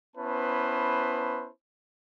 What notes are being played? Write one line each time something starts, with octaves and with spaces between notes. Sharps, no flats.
B3 C#4 E4 B4 C5 A5